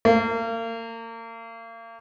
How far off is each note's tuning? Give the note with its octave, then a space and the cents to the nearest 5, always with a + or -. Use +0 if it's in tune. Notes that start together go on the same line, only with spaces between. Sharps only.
A#3 -35